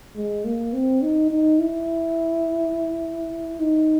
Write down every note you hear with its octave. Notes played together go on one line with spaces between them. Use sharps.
G#3
A#3
C4
D#4
D#4
E4
D#4